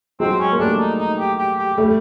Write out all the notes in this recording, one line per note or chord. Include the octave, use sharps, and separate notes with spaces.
F#3 G#3 C4
C#4
A#3
G3 A3 D4
D#4
D#4
G4
G4
G4
G3 A3